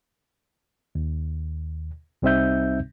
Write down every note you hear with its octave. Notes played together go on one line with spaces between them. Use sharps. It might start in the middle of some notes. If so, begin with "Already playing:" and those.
D#2
C2 G3 C4 D#4 E5 G6